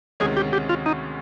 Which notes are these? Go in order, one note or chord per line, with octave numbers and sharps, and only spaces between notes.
D2 C3 D#3 G#3 C#4 G#4
G4
G4
F4
D#4